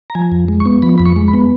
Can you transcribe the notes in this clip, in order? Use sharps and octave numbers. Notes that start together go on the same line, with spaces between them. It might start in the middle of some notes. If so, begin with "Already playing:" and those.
A#5
F3 G#5
F2
G#3
C#6
B3
F3 B5
F2 B5
C#6
G#3
B5
B3